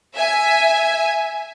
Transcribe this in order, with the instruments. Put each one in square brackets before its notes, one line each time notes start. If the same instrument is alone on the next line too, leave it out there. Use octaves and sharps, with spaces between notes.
[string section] E5 G#5